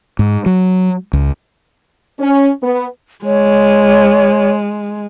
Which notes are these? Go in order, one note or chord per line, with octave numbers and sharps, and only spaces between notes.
G#2
F#3
C#2
C#4
B3
G#3 C#5